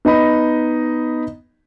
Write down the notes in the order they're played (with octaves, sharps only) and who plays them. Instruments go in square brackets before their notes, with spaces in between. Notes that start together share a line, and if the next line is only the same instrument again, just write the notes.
[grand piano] B3 D#4 D#5 B5